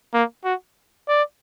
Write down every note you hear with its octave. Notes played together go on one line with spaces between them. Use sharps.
A#3
F#4
D5